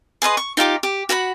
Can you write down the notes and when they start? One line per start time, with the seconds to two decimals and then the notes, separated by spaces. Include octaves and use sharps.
0.22 G#4 B4 D#5 C6
0.37 C#6
0.57 D#4 F4 G4 D6
0.83 G4
1.09 F#4 F#5 A#5 B5